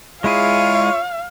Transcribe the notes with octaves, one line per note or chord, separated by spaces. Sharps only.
G#3 E4 F4 G#4 C#5 F5